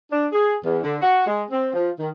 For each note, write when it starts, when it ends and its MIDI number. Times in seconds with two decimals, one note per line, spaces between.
0.10 0.26 62
0.31 0.55 68
0.63 0.78 40
0.82 0.95 50
1.00 1.26 66
1.26 1.43 56
1.50 1.69 60
1.74 1.89 53
1.99 2.08 51